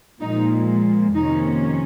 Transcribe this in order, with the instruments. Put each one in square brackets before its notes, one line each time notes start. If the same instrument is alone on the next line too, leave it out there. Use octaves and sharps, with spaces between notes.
[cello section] A#2 F3 G#3 D#4
F2 C3 D#3 A#3 C#4 D#4